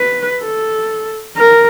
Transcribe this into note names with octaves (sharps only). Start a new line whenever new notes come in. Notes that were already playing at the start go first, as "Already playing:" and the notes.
Already playing: B4
A4
A#4